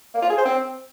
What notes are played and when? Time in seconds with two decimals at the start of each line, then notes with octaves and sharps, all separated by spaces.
0.14 A#3
0.22 F4
0.30 G#4
0.38 C5
0.45 C4